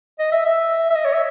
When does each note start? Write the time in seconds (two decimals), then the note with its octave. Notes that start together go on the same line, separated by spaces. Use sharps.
0.19 D#5
0.32 E5
0.45 E5
0.90 E5
0.95 D#5
1.05 C#5
1.13 E5